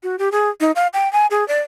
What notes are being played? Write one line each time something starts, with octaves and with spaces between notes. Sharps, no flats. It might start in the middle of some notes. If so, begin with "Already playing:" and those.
F#4
G4
G#4
D#4
F5
G5
G#5
G#4
D5